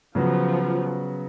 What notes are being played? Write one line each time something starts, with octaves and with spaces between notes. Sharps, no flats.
C#3 F3 F#3 B3 F#4